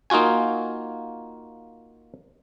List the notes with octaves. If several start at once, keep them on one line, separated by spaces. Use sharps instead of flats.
A#3 D#4 F4 F#4 G#5